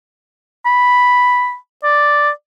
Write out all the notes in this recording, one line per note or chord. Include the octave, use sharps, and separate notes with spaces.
B5
D5